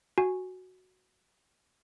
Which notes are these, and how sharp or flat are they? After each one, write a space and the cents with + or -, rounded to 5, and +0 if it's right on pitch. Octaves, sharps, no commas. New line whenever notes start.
F#4 +0 G#5 +0